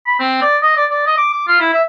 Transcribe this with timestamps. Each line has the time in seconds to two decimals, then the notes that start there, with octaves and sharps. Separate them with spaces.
0.07 B5
0.20 C4
0.42 D5
0.62 D#5
0.77 D5
0.90 D5
1.06 D#5
1.18 D6
1.33 D6
1.48 F4
1.60 E4
1.73 E5